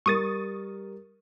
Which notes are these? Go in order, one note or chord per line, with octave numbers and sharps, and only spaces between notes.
G3 A#4 C#6 D#6 A6 D#7